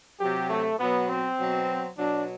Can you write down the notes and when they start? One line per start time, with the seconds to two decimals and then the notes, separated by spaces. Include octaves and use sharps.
0.19 C3 F#3 G4
0.50 A3
0.79 B2 F#3 B3
1.08 C4
1.39 B2 F#3
1.98 B2 F#3 D4